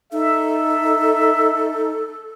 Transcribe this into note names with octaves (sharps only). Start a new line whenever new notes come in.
D#4 A4 E5